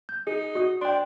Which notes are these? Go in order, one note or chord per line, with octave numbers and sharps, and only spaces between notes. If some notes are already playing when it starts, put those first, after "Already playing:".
G6
D#4 G#4
F#4 D#5 D#6
D4 G5 C6